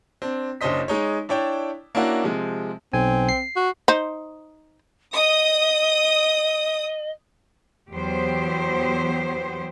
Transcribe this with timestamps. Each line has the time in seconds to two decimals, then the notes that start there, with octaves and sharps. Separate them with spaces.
0.22 C4 D4
0.61 F#1 C#4 D4 C5 D#5 B6
0.88 G#3 D#4 C#5
1.29 D4 E4 C#5 D5 G5 A5
1.95 A#3 C#4 D4 E4 F#4 A#4
2.24 C3 F3 G#3
2.93 B1 C4 G#5
3.29 C7
3.56 F#4
3.88 D#4 C5
5.15 D#5 D#6
7.92 E2 F#3 B3 G4 C5